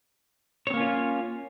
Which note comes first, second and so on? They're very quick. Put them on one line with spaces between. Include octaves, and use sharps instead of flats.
C#5 C4 A#3 C#4 F4